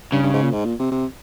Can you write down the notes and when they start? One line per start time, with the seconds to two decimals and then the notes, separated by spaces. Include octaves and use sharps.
0.12 G2 C#3
0.23 G2
0.33 G#2
0.43 A#2
0.53 G#2
0.65 A#2
0.79 C3
0.92 C3